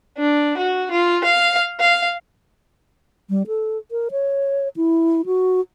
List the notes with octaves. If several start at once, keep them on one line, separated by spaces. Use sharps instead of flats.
D4
F#4
F4
F5
F5
G3
A4
A#4
C#5
E4
F#4